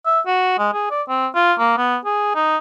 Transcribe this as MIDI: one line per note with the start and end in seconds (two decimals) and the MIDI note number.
0.06 0.20 76
0.27 0.55 66
0.58 0.69 56
0.73 0.87 68
0.91 1.02 74
1.09 1.27 60
1.35 1.53 65
1.59 1.77 58
1.78 1.97 59
2.05 2.34 68
2.35 2.57 63